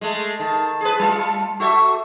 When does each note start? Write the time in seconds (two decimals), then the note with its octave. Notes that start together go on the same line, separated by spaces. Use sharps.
0.01 G#3 A3
0.39 D#3 A5
0.81 G#4 B4
0.99 G3 F4
1.60 F#4 A4 E5 C#6